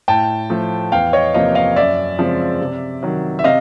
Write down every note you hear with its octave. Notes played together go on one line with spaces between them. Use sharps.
A2 G5 A5
F3 A3
E2 F5 G5
C#5 D#5
C3 F3 A#3 D#5 F5
D#5 F5
F#2 D5 E5
C#3 F3 G#3 C4
C3
D#3 F#3
E5
C3 D#5 F5